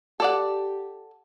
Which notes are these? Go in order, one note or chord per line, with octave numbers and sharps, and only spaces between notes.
G4 A4 D5 F#5